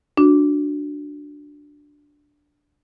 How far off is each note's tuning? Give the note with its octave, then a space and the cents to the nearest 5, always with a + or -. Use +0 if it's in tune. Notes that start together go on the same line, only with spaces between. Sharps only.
D4 +0 F#4 -15